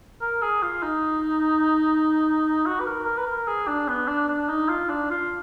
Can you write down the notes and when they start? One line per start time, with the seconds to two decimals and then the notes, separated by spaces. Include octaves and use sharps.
0.22 A#4
0.42 G#4
0.62 F4
0.83 D#4
2.66 F#4
2.80 B4
2.86 A#4
3.06 A#4
3.18 B4
3.27 A#4
3.47 G#4
3.67 D4
3.88 B3
4.08 D4
4.29 D4
4.49 D#4
4.69 F4
4.90 D4
5.10 F4